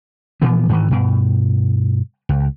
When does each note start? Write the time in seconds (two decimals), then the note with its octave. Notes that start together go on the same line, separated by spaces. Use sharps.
0.42 A#2 E3 F3 B3
0.69 G#2 D#3 E3
0.91 G2 B2
2.29 C#2